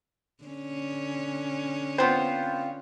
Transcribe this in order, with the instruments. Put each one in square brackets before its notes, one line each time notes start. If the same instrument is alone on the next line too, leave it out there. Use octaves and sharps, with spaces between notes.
[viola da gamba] D3 C#4
[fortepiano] B3 C5 [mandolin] C4 F4